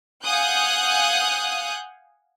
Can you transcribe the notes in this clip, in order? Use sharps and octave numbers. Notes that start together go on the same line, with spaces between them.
F5 F#5 G#5 D#6 F#6 G6